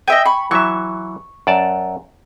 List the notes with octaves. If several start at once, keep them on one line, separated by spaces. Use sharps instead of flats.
D#5 E5 G5 G#5
B5 C#6
E3 F#3 E5 C#6
F#2 D5 A5